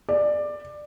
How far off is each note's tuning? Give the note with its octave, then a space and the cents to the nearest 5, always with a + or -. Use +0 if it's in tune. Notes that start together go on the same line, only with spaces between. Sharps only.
D5 +15